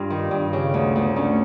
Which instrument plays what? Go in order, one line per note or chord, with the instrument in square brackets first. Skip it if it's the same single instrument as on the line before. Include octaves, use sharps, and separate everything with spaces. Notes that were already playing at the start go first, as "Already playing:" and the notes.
Already playing: [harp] G2 F4
D#3
G2
C#3
D2
D2
D2 C#4